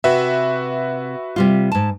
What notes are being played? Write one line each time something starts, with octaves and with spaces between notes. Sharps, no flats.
C3 F#4 B4 E5
C3 G3 F4
G#2 A5